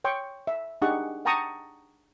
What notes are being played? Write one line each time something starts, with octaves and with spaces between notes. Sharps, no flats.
C#5 G5 C6 C#6
E5
D4 D#4 G4 G#4 F#5 C#6
F#5 G5 A5 A#5 C#6 D#6